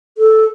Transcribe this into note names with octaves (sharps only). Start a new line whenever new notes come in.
A4